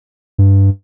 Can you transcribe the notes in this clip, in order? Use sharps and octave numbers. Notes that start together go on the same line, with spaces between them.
G2